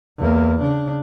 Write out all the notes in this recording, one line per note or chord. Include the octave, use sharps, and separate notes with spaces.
E2 A#3
C#3 D4